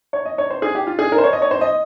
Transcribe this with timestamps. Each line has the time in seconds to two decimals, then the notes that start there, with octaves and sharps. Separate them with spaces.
0.13 C#5
0.25 D#5
0.38 C#5
0.50 C5
0.62 G#4
0.75 G4
0.87 F4
0.99 G#4
1.12 A#4
1.18 C5
1.24 C#5
1.33 D#5
1.42 C#5
1.51 C5
1.61 D#5